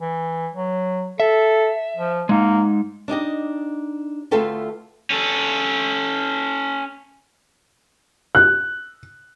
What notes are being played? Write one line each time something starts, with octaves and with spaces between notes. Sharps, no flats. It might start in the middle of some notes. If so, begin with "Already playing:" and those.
E3
F#3
A4 E5
F3
G#3 A#3 D#4
D4 D#4 G4 D#5
D2 A3 F4 A4 B4 G5
C#4 A4
F#6